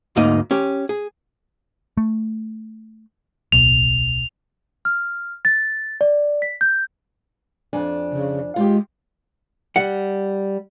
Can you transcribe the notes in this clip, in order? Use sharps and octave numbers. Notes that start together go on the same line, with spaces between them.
D2 G#2 A#3 D#4 D#5
C#4 G4
G#4
A3
D1 B1 B2 F7
F6
A6
D5
B6
G6
F2 D4 G#5
C#3
G#3 F4 G4
G3 F#5